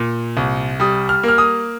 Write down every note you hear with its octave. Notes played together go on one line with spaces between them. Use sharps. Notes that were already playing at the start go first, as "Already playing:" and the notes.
Already playing: A#2
C2
G3 D#6
F6
A#3 F6
D#6